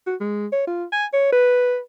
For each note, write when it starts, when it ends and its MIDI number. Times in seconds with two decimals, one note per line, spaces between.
0.07 0.15 66
0.20 0.47 56
0.52 0.63 73
0.67 0.84 65
0.92 1.05 80
1.14 1.31 73
1.32 1.79 71